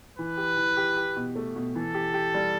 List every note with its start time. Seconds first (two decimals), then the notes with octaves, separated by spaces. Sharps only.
0.18 E3 B4
0.37 G4
0.57 E3
0.77 G4
0.97 G4
1.16 B2
1.35 A3
1.56 B2
1.75 E3 A4
1.94 G4
2.14 G4
2.34 G3